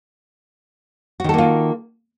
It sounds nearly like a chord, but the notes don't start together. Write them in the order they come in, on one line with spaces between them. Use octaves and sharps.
F#4 D#3 A4 A#3 F4